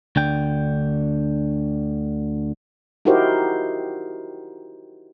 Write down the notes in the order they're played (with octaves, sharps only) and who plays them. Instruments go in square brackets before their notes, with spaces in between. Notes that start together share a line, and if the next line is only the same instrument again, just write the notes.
[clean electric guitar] D2 D3 G5
[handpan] D#4 E4 F#4 G4 A#4 C5